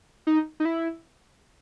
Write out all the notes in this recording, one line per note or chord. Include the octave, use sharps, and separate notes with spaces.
D#4
D#4
E4